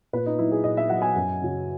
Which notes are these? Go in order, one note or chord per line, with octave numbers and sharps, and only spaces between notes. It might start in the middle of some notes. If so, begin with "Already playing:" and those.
A#2 B4
D#4
F#3 E4
G#4
A#2 D#5
E5
F#3 F#5
G#5
F#2
C#3 F#3